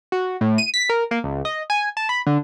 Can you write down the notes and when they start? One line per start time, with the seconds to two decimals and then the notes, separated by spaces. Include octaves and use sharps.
0.12 F#4
0.41 A2
0.58 D#7
0.74 B6
0.89 A#4
1.11 A#3
1.24 C#2
1.45 D#5
1.70 G#5
1.97 A5
2.09 B5
2.26 D3